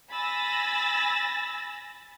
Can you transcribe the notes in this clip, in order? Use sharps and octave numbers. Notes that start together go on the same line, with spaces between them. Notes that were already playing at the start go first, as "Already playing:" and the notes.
G#5 B5 E6 A6 A#6